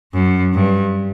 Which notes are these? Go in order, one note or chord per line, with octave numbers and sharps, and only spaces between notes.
F#2
G2